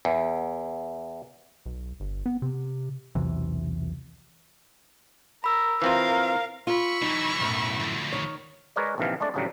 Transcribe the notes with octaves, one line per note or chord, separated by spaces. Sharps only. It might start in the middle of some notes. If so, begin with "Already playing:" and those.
E2
B1
G1
B3
C3
B1 E2 C3 E3
A#4 B5 E6
E3 C4 F4 A#4 F5
F4 B5 C#6 E6
E3 F#3 D#4
B1 F#2 A2
D2 F3
D#3 C#5
G#3 A#4 B4 C#5 D5
A#1 C3 D#3 E3 F5
G#3 A3 D4 D5
A1 D2 A2 C#3 F#3 G3